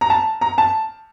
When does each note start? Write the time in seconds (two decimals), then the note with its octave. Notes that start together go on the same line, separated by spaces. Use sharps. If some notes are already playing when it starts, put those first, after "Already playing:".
0.01 A#5
0.10 A5
0.41 A#5
0.58 A5